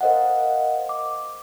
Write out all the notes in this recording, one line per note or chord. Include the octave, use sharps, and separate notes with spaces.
A#4 C5 D#5 F5 F#5
D6